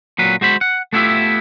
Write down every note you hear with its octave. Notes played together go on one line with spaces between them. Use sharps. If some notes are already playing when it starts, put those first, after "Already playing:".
A#2 F#3 B4
G#3 F#4 C5 B5
F#5
A3 B3 E4 F4 G4 E5